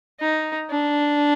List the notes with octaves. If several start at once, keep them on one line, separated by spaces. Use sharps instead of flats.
D#4
D4